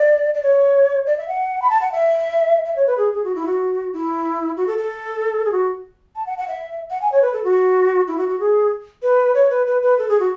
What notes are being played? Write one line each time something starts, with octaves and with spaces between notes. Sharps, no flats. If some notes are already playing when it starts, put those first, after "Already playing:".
Already playing: D5
D5
C#5
D5
E5
F#5
B5
A5
F#5
E5
E5
C#5
B4
G#4
G#4
F#4
E4
F#4
E4
F#4
A4
A4
G#4
F#4
A5
F#5
F#5
E5
F#5
G#5
C#5
B4
A4
F#4
E4
F#4
F#4
G#4
B4
C#5
B4
B4
B4
A4
G#4
F#4